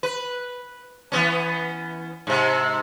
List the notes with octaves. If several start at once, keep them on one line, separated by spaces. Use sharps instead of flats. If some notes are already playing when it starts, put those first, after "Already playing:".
B4
E3 B3 C#4
G#2 C3